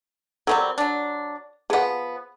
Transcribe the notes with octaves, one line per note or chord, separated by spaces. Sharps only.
F#3 G3 C4 A4 A#4 A#5
F#3 D4
F3 B3 G#4 F#5